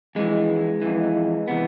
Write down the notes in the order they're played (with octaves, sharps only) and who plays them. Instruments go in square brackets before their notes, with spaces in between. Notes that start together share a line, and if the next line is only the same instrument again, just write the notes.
[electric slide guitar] F2 E3 G#3
F2 E3
C3 E3 B3